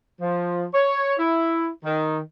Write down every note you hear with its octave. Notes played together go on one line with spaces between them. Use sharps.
F3
C#5
E4
D#3